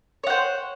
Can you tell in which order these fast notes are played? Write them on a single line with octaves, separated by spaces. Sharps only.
C#5 F#5 C5